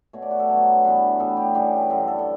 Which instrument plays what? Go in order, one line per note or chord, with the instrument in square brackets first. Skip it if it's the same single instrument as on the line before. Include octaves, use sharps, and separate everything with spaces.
[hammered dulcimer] B2 A3 C#5
D5
F#4
A4
G2 F#3 B3 C#5
G2 E3 B3 B4
A2 G3 B3 A4
G4
C#3 E3 G3 B3 G4
F#2 D3 G3 A4
A4
A4